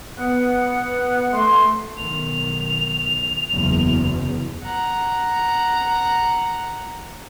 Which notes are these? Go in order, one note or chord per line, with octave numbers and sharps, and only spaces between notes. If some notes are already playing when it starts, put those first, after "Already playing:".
B3 F#5
A3 C6
B1 D#3 F7
F#1 E2
F#5 A#5